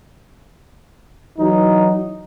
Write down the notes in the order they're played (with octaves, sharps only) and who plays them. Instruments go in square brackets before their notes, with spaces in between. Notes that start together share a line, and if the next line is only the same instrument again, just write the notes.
[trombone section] E3 F#3 D#4